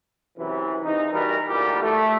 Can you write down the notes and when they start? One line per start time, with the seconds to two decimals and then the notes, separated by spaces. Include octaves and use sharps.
0.37 F#2 C3 E3
0.84 E2 D#4
1.12 E3 G3 F#4 A#4 B4
1.48 D2 A#2 E3 G3 G4
1.82 A3